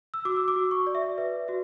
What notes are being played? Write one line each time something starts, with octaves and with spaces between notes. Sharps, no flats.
E6
F#4 D6
E6
D6
F#4
C#6
D5
E5
B4 E5
F#4 E5